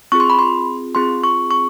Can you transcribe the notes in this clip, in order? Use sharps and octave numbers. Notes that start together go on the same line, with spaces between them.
C4 F4 G#4 C#6
C6
B5
C6
C4 F4 G#4 C6
C#6
C#6